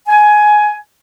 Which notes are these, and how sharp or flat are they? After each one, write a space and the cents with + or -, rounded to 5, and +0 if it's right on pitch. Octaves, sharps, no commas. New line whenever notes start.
G#5 +15